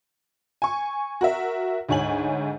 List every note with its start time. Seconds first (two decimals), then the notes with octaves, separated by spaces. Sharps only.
0.62 G#5 C#6
1.21 F#4 A#4 E5
1.89 D2 G#2 C#5 G#5 F#7